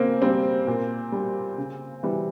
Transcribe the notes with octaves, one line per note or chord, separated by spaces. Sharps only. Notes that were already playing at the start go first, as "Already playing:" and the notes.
Already playing: C#3 A#3 C4
G3 C4
A#2
G3
C#3
E3 G3